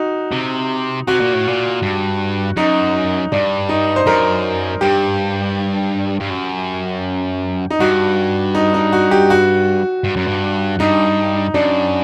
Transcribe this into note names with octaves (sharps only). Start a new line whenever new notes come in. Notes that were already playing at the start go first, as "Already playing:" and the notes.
Already playing: D#4 F#4
C3
C3 F#4
A#2
A2
A#2
G2
F#2 D#4
G2 D4
D#4
C5
F#2 A#4
G2 G4
G2
F#2
D#4
G2 F#4
D#4
D#4
F#4
G4
F#4
G2
F#2
G2
G2 D#4
F#2 D4